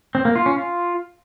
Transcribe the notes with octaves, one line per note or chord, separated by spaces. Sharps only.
C4
A#3
F4
C#4
F4